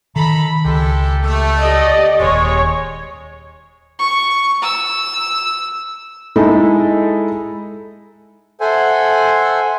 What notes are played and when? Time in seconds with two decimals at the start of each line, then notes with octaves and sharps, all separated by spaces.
0.16 D#3 A4 A#5 B5
0.65 C#2 G#3 G4 A4
1.23 A3
1.58 G4 D5 D#5
2.20 D#1 G#3 C#5
3.99 C#6
4.62 E6
6.36 G#3 D#4 E4 A4 D#5
8.60 A4 C5 E5 F#5 G#5